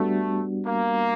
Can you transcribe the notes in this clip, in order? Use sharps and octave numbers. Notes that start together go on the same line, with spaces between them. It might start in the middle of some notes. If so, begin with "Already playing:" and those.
Already playing: G3 A3 B3 D4 F#4
A#3